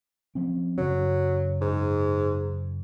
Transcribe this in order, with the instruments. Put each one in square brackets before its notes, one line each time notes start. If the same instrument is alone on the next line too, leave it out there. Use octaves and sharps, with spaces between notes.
[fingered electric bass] F3 C4 C#4
[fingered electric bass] F#2 C#3 C#4 [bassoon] F#3
[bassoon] G#2